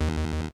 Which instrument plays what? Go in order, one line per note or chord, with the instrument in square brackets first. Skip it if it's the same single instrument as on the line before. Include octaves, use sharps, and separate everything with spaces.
[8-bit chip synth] D#2